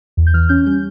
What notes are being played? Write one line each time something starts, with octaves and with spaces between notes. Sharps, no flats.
E2
G6
E3 F6
C#4 G6
G3 G6